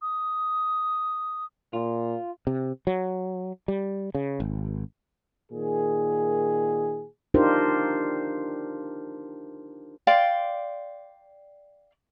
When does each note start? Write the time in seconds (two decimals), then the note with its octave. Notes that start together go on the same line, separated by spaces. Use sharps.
0.02 D#6
1.73 A#2 F4
2.47 C3
2.87 F#3
3.68 G3
4.15 C#3
4.40 G#1
5.52 A#2 D#3 G#4
7.34 D4 D#4 F4 G4 A#4 C5
10.07 D5 F5 G5 C6